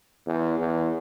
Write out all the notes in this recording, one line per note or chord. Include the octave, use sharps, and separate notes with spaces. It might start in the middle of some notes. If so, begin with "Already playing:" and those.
E2
E2